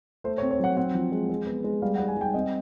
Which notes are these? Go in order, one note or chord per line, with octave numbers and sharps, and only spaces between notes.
A3 C5
C#5
C4
C#5
F#3 F#5
C4 F#5
F3
G#3
G#3
B3
G#3
G3 F5
F#5
G3
G#5
G3 G5
C4 D#5